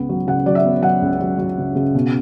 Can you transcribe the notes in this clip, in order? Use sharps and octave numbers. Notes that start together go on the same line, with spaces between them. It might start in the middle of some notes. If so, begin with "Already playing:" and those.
Already playing: C#2 B3
F#3
C#3 F#5
F#3 D5
E5
B3
F#3 F#5
C#2
F#3
F#3
C#3
C#3
B2